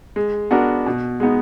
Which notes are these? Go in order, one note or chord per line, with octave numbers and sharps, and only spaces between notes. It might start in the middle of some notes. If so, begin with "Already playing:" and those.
G#3
B3 D4 F#4 A#4
B2
G#3 B3 D#4